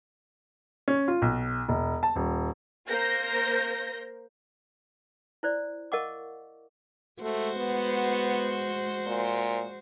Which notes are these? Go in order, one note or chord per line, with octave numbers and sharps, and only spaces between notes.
C#4
F4
B1
E1
A5
D#1
A#3 A#4 C5 G6 A#6
E4 C5 D5
A#4 D#5 F5 F#5 C#6 D6
G#3 A3 F#4 C5
B3
A#2